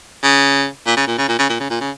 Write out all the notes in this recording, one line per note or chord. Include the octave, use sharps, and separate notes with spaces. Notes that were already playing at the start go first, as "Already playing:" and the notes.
C#3
A#2
C#3
A#2
C#3
A#2
C#3
A#2
C#3
A#2
C#3